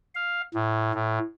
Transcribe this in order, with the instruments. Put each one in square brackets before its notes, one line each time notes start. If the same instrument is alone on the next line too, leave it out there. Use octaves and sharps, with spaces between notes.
[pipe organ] F5
A2
A2